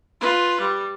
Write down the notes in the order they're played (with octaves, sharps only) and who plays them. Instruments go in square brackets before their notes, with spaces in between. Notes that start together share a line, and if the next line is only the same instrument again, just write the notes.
[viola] F4 B4
G3